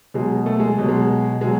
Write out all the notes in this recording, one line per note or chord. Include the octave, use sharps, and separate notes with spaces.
B2 F#3 G#3
A3
G#3
B2 F#3
G#3
B2 F#3 G#3